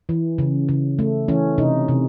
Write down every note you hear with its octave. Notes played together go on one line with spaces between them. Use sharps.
E3
C#3
C#3
A3
E3 C#4
C3 D#4
C3